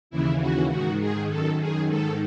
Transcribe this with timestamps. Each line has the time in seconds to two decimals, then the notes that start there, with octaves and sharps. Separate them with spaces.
0.11 D#2 C#3 E3 E4
0.40 F#4
0.70 G#2 D#3 F#4
1.00 G#4
1.29 F#2 D#3 A4
1.60 G#4
1.88 G#2 D#3 A4